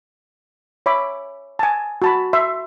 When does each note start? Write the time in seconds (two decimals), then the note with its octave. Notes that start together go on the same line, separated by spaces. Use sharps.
0.86 C#5 E5 B5 D6
1.59 G#5 A5
2.02 F#4 A5 B5
2.33 E5 C6